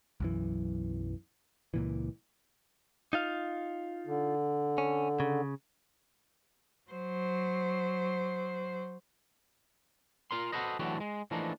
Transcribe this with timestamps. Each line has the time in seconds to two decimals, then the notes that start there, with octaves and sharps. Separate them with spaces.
0.20 B1 F#2 E3
1.74 C#2 A#2 E3
3.13 D#4 F4 F5
4.07 D3
4.78 C#4
5.20 C#3
6.91 F#3 C5
10.31 F4 A#4 C6
10.52 F#4 A4 B4 C5 D#5
10.79 D3 E3 F#3 A3 F#4 G4
11.00 G#3
11.31 E3 F3 A3 A#3 D4 D#4